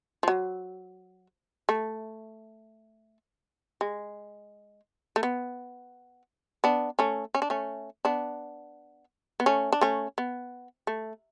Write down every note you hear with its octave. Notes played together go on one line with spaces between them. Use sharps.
F3
F#3
A3
G#3
A3
B3
B3 D4
A3 C#4
C#4
D4
A3 C#4
B3 D4
B3
A3 C#4
D4
A3 C#4
B3
A3